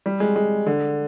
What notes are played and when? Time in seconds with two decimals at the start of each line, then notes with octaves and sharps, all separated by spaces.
0.06 G3
0.20 G#3
0.36 G#3
0.66 D3